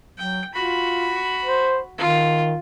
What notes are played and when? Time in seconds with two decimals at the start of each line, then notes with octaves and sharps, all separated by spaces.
0.18 F#3 G5
0.54 F4 F#4 B5
1.45 C5
1.98 D#3 F4